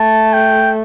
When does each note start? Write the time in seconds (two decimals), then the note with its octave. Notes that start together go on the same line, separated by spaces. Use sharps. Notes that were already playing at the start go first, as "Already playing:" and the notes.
Already playing: A3 A5
0.33 G5